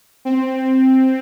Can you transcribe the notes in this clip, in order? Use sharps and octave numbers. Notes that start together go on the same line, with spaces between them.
C4